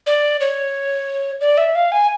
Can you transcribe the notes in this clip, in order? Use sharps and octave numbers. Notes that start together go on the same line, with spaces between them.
D5
C#5
D5
E5
F5
G#5